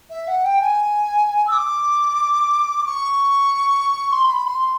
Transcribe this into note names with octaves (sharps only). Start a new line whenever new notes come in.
E5
F#5
G5
G#5
E6
D6
C#6
C6
B5
C6